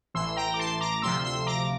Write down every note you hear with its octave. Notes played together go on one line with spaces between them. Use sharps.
A1 A2 E3 C6 E6
G5 A#5
D6
A5 C6
A#5 D6
D2 C3 F3 C6 E6
C6 E6
A#5 D6